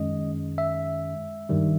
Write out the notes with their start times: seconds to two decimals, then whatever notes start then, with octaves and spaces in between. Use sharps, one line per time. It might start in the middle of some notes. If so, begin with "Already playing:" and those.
Already playing: F#2 D#3 G#3 C#4 D#5
0.58 E5
1.49 G2 D#3 G3